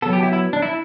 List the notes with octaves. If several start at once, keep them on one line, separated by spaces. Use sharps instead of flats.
F#3 B3 A4
G4
E4
E4
D4
E4